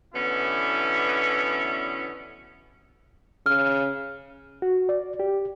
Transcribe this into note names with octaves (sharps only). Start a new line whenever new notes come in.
B2 D3 E3 B3 C#4 E4
C#3 F6
F#4
D5
G4